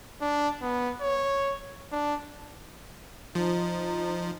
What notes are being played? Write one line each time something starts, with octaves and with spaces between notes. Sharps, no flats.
D4
B3
C#5
D4
F3 D#4